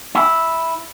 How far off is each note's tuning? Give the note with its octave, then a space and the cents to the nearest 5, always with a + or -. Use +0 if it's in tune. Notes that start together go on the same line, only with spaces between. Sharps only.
E4 -5